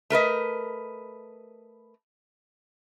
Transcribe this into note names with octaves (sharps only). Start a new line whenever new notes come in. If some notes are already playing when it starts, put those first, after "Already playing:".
A3 A#4 B4 D#5